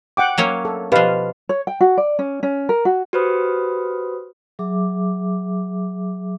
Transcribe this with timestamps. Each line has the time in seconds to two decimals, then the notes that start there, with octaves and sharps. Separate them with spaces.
0.17 F#5 G5 D6
0.38 F#3 A#3 C#4
0.65 A4
0.92 B2 F3 G4 B4 F5
1.49 C#5
1.67 G5
1.81 F#4
1.98 D5
2.19 C#4
2.43 C#4
2.69 A#4
2.85 F#4
3.13 F#4 G4 B4 C5 B5 D#6
4.59 F#3 G#4 E5 D6